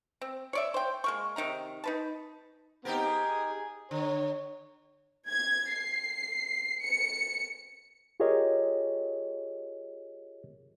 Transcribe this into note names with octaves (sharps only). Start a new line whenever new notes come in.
C4
C#5 D5 E5
C5 G5
G#3 A#3 C#6
C3 D#3 D#4 A#5
D#4 B4 A5
B3 C4 D#4 G4 A#4
G#5 D#6
D3 C#5
G#6
C7
C#7
F4 G4 G#4 A#4 C#5 D#5